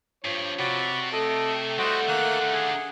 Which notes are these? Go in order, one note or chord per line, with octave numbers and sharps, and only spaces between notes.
G2 F3 C#5
C3 F#4 D5 B5
A3 A4 D#5
G3 E4 F#4 C5 D#5 F#5
D3 D#3 A#3 F#6
G#4